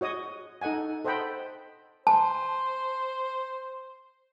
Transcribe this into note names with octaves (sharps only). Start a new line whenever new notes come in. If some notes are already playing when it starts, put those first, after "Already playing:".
F#4 C#5 D#5 D#6
D#4 A4 D#5 F#5 G#5
A4 C5 D#5 F#5 G5 B5
C5 A5